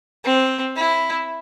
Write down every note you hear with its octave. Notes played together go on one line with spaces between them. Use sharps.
C4
E4